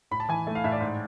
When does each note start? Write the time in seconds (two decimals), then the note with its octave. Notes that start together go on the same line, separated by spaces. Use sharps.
0.11 A2 B5
0.20 A5
0.29 E3 G#5
0.47 A3
0.55 F5
0.64 A2 E5
0.72 D5
0.80 G#2